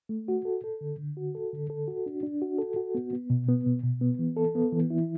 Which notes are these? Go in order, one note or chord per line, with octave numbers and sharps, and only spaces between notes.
A3
F#4
A4
A4
D3
D3
F#4
A4
D3
A4
F#4
D4
D4
F#4
A4
F#4
B3
B3
B2
B3
B2
B2
B3
E3
A4
B3
E3
E4